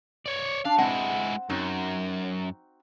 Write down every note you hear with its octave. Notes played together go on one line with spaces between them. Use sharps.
C#5 D5
D4 F5
G#3 C4 E4 F#5
F#2 C4 D#4 F#4